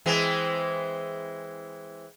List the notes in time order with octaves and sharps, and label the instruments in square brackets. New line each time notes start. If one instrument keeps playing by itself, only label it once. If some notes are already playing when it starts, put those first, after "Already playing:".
[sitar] E3 G#3 C4